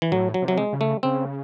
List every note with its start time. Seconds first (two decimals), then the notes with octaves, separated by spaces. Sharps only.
0.02 E3
0.11 A2 F#3
0.34 F#3
0.42 C3
0.48 F#3
0.58 G#3
0.73 C#3
0.81 A3
1.03 C#3 C4